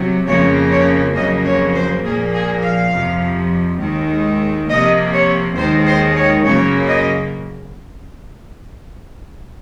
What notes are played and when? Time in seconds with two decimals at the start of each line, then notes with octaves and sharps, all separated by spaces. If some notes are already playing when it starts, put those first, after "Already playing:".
Already playing: C3 F#3
0.27 F2 C#3 F3 A#3 C#5
0.71 C#5
1.16 F2 C#3 F#3 A#3 D#5
1.45 C#5
1.75 C5
2.04 A#2 F3 A#3 G#4
2.34 G#4
2.63 F5
2.92 F2 C3 F3
3.81 D#2 D#3 G#3
4.69 C3 F3 A#3 D#5
5.13 C#5
5.57 D#2 D#3 G#3 C5
5.86 C5
6.16 C#5
6.45 F#2 C#3 F#3 A#3 C#5
6.89 D#5